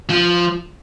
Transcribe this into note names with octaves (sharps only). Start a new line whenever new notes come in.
F3